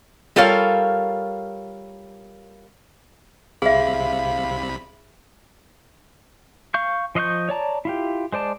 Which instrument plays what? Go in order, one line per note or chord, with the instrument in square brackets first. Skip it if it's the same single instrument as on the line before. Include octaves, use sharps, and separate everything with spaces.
[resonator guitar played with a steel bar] G3 F4 A4 A#4 C#5 F5
[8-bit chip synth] C2 C3 B5 [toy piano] G#4 E5 [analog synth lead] F5
[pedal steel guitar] F5 C#6 G6
F3 D#5 F5 C#6 G6
C#5 D5 A5 A#5
E4 F4 G4
G#3 C5 D5 A5